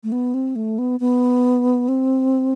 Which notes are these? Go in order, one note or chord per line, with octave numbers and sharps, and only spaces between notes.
A3
B3
C4
A3
B3
B3
C4